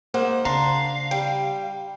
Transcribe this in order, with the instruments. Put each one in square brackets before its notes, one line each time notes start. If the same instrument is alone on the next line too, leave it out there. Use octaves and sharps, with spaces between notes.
[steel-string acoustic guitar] G#2 C5 F#5 [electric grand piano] A#3
[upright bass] C#3 [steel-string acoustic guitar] D4 [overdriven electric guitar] F5 [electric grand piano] A#5 C6
[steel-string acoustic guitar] G3 [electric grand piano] G5